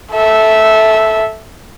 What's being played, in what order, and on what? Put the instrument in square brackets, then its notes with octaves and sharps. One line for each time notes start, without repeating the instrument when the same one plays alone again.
[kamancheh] A4 E5